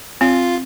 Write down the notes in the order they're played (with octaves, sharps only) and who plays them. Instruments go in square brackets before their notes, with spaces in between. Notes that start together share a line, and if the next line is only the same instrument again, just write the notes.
[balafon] C4 [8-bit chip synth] F4